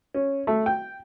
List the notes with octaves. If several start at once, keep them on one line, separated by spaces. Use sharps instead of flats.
C#4
A3
G5